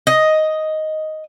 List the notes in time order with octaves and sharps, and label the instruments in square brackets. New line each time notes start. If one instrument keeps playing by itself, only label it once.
[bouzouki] D#5